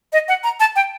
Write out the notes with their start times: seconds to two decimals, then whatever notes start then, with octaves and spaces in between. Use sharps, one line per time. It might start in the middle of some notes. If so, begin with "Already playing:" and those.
0.13 D#5
0.28 F#5
0.44 A#5
0.60 A5
0.76 G5